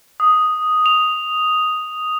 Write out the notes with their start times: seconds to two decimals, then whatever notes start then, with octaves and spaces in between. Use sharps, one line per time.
0.20 D#6
0.86 F7